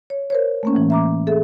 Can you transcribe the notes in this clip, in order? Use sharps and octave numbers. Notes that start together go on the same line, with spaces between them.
C#5
A#4 C5 C#5
A3 A#3 C#4
A2 E3 G#3
E5 A#5 D6
G#4 A4 E5